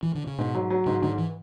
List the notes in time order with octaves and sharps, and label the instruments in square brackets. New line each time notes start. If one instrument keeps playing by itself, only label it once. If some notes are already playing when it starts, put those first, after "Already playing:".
[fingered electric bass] E3
D3
C#3
[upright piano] G#2 [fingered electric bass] B2
[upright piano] F#3
F#3
[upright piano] G#2 [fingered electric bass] C#3
[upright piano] G#2 [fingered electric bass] D3
[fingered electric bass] E3